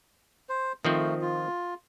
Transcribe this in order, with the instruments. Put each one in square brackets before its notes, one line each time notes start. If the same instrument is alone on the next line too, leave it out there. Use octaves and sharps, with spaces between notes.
[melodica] C5
[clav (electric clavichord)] D#3 F3 C4 [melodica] A3
[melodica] F4